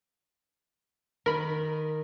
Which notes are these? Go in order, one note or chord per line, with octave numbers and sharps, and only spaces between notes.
D#3 A#4 B5